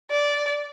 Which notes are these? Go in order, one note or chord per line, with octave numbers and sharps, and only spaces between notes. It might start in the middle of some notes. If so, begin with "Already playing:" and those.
D5